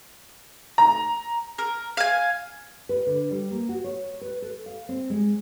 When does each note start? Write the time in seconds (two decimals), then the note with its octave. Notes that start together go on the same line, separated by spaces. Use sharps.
0.78 A#5
1.58 A#4
1.97 F5 G#5
2.89 B4
3.07 D3
3.31 G3
3.51 A#3
3.69 F#4
3.84 C#5
4.21 B4
4.42 A4
4.66 F5
4.89 C4
5.10 G#3